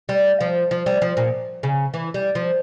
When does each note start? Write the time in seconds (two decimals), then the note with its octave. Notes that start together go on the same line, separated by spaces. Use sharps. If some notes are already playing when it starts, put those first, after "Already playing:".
0.09 G3
0.41 F3
0.71 F3
0.86 G3
1.02 F3
1.17 A#2
1.63 C#3
1.94 E3
2.14 G3
2.35 F3